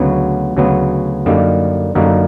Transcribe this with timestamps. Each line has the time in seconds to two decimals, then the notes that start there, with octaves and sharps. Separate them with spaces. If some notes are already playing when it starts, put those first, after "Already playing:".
Already playing: D2 C#3 F#3 B3
0.57 D2 C#3 F#3 B3
1.26 F#2 D3 G3 A#3 D#4
1.95 F#2 D3 G3 A#3 D#4